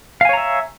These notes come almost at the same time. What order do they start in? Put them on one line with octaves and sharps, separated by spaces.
F5 G#5 C#5 A#5 E5